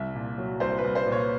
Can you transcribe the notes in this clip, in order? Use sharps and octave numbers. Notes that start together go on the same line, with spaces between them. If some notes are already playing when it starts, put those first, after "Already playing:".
Already playing: C2 E5
A#2
F#3
C2 C5
B4
C2
C5
A#2
C#5